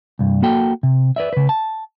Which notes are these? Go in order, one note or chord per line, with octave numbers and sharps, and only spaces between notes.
C2 G2
A#3 F#4 A4 G5
C3
B4 D5 E5
C#3 B4
A5